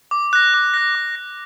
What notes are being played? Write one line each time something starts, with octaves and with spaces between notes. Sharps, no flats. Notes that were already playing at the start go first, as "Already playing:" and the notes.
D6
F#6 A#6
D6
F#6 A#6
D6
F#6 A#6